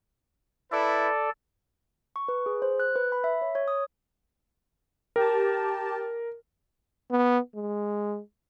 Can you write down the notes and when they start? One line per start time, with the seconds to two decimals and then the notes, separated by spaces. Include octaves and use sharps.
0.72 E4 A4 B4 D5
2.16 C#6
2.28 B4
2.46 G#4
2.62 C5
2.80 F#6
2.96 B4
3.12 B5
3.24 E5
3.42 C#5
3.55 C#5
3.68 D#6
5.16 G4 A#4 A5
7.11 B3
7.56 G#3